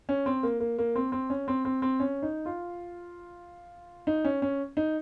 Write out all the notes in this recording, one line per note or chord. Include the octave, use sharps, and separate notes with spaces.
C#4
C4
A#3
A#3
A#3
C4
C4
C#4
C4
C4
C4
C#4
D#4
F4
D#4
C#4
C#4
D#4